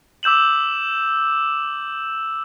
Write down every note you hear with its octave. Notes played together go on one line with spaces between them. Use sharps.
D6 E6 G6 E7 F#7